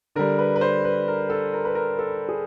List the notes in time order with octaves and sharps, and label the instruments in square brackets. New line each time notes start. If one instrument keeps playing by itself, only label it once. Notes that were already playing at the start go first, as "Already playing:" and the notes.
[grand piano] D3 G3 A#4
B4
B4
C5
B4
A#4
A4
A#4
B4
A#4
A4
G#4